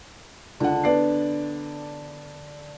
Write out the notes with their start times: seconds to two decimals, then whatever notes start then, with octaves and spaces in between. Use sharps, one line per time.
0.60 C#2 D3 F#5
0.84 B3 D5 C7